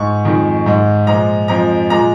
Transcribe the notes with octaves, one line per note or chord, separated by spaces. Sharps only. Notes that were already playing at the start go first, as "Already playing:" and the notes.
Already playing: G#2 G#3 C#6
F2 D#3 G#3
G#2 G#3
A#2 F3 G#3 A#5
F2 F3 G#3 A#5
A#2 G#3 A#5